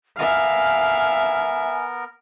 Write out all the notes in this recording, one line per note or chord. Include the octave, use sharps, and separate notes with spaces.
B3 A#4 E5 F5 G#5